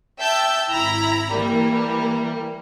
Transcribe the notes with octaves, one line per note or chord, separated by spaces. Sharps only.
E5 G5 A5 E6 G6
G#1 E4 A#5 B5
E3 G3 A#3